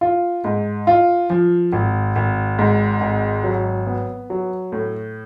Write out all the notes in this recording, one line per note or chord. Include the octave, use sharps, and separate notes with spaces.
F4
G#2
F4
F3
G#1
G#1
G#2
G#1
F#3
B3
F#3
A2